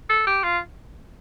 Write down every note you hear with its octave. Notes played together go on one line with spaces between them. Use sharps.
A4
G4
F4